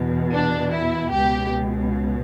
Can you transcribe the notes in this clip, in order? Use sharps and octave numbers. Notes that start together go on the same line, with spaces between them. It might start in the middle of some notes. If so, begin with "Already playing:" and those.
Already playing: E2 B2
D4
E4
C#2 B2 G4